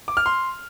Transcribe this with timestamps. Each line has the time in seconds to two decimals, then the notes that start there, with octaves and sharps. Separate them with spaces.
0.08 D6
0.17 F6
0.26 C6